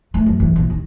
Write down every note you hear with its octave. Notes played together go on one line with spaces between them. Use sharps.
A3
F#2
E3
A#1
D#3